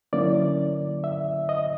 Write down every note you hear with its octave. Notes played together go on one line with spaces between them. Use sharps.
D3 F#3 A#3 C#4 E4 D5
E5
D#5